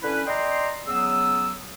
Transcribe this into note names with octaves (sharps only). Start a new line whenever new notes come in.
D3 C#4 E4 B4
D5 D#5 G5 A#5 C6
C#3 F#3 B3 D#6 E6